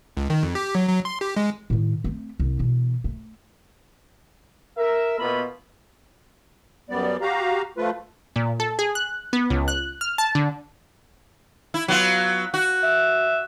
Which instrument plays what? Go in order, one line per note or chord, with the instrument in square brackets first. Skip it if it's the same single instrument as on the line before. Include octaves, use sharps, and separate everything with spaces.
[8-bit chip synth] C#2
D#3
F2
G4
F#3
F#3
C6
G4
G#3
[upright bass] A2 D#3
A3 C4
C2
B2 E3
A3
[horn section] A#4 E5
B2 A#3 B3 F4 E5 B5
[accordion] F#2 G3 B3 D5
F#4 G4 F5 A#5
F3 A3 F4 B4
[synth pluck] A#2
A4
G#4
F#6
B3
C#2
F#6
F6
A5
D3
[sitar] E4
F#3 B3 F4
F#4
[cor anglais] E5